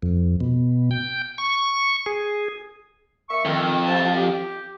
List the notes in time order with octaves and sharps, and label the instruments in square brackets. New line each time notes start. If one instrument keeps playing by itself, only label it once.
[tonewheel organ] F2
B2
G5
C#6
G#4
[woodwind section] A#3 E5 C#6
[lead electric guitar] F2 [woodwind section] D#3
[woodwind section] C3 G5 A5
G4